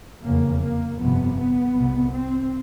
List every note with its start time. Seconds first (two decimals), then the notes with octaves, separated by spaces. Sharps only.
0.24 F1 E2 C#3 A#3
0.62 A#3
0.99 G1 F2 C3 B3
1.38 B3
1.75 C2 C3
2.13 C4